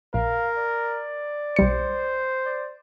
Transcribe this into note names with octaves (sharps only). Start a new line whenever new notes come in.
A#1 A#4 F5
D5
B1 G3 C5 C#7
D5